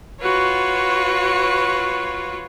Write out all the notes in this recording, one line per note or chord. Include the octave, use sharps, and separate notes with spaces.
F4 F#4 B4 C#5